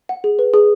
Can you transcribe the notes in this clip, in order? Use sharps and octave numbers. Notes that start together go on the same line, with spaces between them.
F#5
G#4
B4
G#4